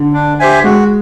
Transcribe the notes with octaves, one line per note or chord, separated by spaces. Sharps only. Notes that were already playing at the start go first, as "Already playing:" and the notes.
Already playing: D3
D4
G4 C5 E5 G#5
G#3 F#4